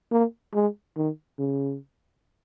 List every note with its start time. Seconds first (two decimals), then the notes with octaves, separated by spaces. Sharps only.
0.12 A#3
0.54 G#3
0.96 D#3
1.39 C#3